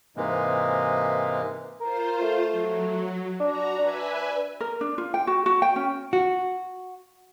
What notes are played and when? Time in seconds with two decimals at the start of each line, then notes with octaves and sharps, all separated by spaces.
0.17 G#2 C3 E3 G#3 A#3
1.80 F4 A#4 C5
2.22 A3
2.52 F#3
3.40 D4 F#4 A#5
3.79 D4 B4 E5 G#5
4.61 A#4
4.81 D4
4.98 F4
5.14 G5
5.27 F#4
5.46 F#4
5.62 G5
5.76 C#4
6.13 F#4